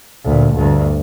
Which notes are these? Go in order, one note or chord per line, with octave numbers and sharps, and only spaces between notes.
D2 A#2
D2 G2